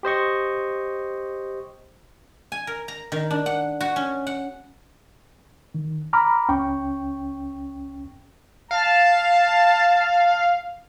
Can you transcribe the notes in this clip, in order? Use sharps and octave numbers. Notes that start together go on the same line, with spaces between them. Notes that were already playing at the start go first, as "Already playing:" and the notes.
G4 C5 D#5 C#6
G#5
A#4
A#5
D#3
D4
F#5
F#4
C#4
F#5
D#3
A#5 B5 D6 F6
C#2 C#4 G5 C#6
F5 A5